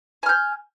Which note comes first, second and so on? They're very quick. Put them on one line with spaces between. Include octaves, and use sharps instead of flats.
G#5 F6 G6